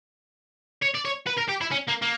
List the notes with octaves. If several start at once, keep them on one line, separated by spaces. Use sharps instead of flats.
C#5
D5
C#5
B4
A#4
G4
E4
C#4
A#3
A#3